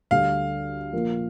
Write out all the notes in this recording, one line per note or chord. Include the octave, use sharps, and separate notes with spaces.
D2 D3 G3 F5
A#2 F3 A#3 F4 A#4